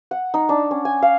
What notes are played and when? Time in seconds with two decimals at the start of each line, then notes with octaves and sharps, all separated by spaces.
0.11 F#5
0.34 D#4
0.49 D4
0.71 C#4
0.85 G#5
1.02 F5